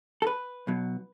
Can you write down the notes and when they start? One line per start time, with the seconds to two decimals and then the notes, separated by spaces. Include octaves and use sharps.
0.22 A4
0.27 B4
0.67 B1 B2 F#3